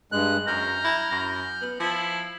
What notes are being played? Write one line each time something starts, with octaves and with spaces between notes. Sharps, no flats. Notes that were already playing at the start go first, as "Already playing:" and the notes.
G2 G#3 F#6
F#2 A#5 F6 G6
E4
F#2
B3
F3 E4